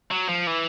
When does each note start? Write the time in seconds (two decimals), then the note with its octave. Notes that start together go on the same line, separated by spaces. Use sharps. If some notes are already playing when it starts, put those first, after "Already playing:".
0.11 F#3
0.29 F3
0.47 E3